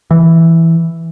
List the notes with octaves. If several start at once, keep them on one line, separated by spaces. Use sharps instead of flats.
E3